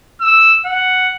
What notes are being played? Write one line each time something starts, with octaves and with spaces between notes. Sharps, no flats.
E6
F#5